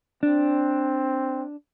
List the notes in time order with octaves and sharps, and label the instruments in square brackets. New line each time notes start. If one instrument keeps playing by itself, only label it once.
[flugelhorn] C4 [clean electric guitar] D4